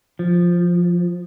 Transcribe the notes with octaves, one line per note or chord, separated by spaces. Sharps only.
F3